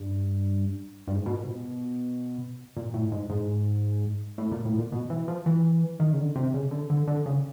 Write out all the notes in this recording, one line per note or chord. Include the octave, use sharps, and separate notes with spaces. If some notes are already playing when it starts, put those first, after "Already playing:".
Already playing: G2
G2
G#2
B2
A#2
C3
B2
A#2
A2
G#2
G#2
A2
A#2
A2
A#2
B2
E3
F3
E3
D#3
C#3
D3
C3
C#3
D3
D3
D3
C#3